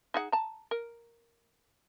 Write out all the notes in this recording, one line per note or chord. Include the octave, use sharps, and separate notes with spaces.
D#4 G#4 F#5
A5 A#5
A#4